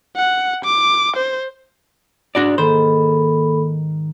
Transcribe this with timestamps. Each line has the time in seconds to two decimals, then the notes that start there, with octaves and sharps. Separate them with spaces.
0.17 F#5
0.65 D6
1.16 C5
2.35 G#2 D4 F#4 D5
2.58 D#3 A#3 A4 C5 B5